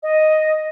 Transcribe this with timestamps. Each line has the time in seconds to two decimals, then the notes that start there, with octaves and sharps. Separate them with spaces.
0.03 D#5